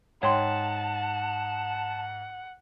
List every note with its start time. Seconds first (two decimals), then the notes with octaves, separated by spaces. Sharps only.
0.23 G#2 C#5 F#5 G5 A5 C6